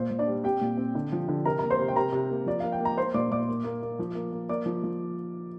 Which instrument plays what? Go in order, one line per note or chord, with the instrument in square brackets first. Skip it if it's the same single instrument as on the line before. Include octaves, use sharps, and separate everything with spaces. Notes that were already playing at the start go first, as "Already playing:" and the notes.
Already playing: [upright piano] A#2 C5
A#2
D4 D5
G3
C4 G4 G5
A#2
C4
D3
F3
D3
C3 A#4 A#5
A#3 A#5
C5 C6
C3
G5
C3 A#4 A#5
C3
A#3
F3 D5
A#3 F5
G5
A#3 A#5
A#3 C5 C6
A#2 D5 D6
A#2 D5 D6
A#3
A#3
A#3
F3
A#3
A#3
A#3 D5 D6
F3
F3